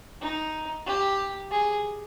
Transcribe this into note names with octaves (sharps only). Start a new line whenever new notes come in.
D#4
G4
G#4